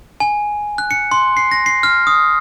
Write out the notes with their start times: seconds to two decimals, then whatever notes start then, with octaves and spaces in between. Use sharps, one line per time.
0.20 G#5
0.78 F#6
0.91 C#7
1.11 C6
1.37 C7
1.51 A#6
1.66 C7
1.83 F6
2.07 D#6